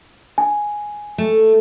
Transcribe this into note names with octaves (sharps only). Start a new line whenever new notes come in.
G#5
A3